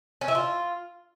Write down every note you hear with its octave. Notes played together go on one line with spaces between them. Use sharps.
C#4
E4
F4